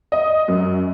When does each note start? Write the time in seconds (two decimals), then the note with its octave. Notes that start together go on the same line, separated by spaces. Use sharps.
0.12 D#5
0.48 F#2